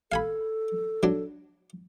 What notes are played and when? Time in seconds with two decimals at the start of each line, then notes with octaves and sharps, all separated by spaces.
0.12 A4 F5 G#5 B5
1.03 F#3 D4